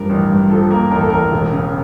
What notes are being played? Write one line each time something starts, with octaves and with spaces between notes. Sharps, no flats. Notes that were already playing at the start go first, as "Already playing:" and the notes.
Already playing: G2 F3 A#4
A1
G2
F3 A4
A#3 A#4
A1 A#4
A4
A1 A#4
E1
C#3